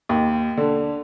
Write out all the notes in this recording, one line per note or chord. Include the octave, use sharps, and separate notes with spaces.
D#2
D3